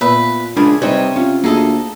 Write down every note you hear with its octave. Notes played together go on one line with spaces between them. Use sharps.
A#2 B3 B4 E5
C#2 D4 G#4 A#4 B5
C3 G3 C4 D#4 B4 C#5 D#5
C#4 F4
D2 A#3 D#4 G#4 A4 D#5